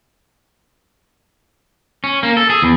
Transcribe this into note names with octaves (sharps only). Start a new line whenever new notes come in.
C#4
A#3
A4
G#4
E2